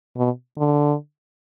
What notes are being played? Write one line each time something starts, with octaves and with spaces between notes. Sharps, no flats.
B2
D3